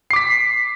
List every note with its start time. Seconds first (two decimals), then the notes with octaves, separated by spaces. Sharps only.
0.11 C7
0.13 D6
0.16 B6